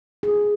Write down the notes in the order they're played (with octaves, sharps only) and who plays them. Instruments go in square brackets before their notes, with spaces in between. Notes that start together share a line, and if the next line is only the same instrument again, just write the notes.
[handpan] G#4